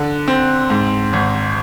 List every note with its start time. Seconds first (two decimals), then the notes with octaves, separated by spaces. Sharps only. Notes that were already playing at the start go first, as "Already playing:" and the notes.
Already playing: D3
0.28 C4
0.70 G#2
1.13 G#1